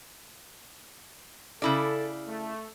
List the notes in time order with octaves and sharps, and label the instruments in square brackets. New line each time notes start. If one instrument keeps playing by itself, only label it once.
[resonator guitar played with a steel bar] C#3 E4 D5 [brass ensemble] A4
[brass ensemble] A3